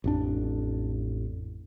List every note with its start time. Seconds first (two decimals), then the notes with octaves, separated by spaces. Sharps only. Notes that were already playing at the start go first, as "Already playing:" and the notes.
0.04 A1 F2 D4